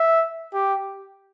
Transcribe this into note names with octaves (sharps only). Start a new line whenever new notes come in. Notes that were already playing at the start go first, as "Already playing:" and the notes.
Already playing: E5
G4